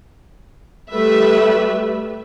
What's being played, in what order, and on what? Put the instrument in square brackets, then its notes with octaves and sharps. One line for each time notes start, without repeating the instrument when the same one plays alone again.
[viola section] G3 A3 B4 E5